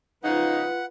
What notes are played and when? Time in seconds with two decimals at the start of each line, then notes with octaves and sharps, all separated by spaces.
0.24 C#3 F3 D#4 F4 B4 F#5